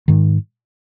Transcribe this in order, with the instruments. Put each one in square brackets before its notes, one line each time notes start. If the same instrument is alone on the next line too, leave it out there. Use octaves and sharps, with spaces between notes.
[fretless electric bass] G#2 D#3 G#3